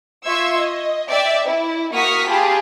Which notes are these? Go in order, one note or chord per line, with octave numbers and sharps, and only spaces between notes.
F4 E5 C6 C#6 E6 G#6
D#5
D5 E5 G5
E4
A#3 F#4 C#6 D#6 F6 B6
F4 G4 G#4 A5 B5